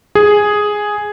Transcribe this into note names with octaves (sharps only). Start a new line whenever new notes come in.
G#4